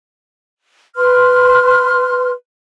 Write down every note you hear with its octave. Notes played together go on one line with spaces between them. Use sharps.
B4 C6 F6